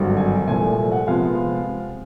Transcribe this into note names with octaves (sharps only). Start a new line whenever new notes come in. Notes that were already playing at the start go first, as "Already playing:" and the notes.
Already playing: G#1 G2 D3 F#3
G#5
C2 A#2 F3 A3 G#5
F#5
C3 F3 G#3 B3 F5